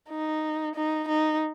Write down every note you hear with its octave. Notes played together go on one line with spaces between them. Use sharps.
D#4
D#4
D#4